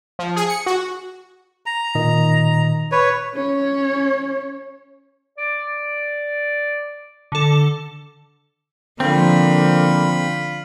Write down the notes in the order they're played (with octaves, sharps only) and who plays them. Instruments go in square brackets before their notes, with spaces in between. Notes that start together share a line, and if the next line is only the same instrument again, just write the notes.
[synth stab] F3
G#4
C#7
F#4
[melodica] A#5
[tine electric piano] A#2 D#3 D#5
[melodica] B4 C#5
[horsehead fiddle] C#4 C#5
[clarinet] D5
[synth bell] D3 A4
[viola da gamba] D3 [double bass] F3 A#3 [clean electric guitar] C4 [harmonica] F4 B5